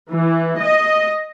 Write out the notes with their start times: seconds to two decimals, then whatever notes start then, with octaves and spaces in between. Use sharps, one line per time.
0.10 E3
0.59 D#5